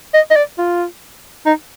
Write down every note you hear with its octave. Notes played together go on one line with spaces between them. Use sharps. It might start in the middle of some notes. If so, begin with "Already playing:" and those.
D#5
D#5
D5
F4
D#4